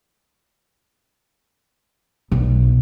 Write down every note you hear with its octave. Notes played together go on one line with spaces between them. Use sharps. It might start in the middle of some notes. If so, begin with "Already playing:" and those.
B1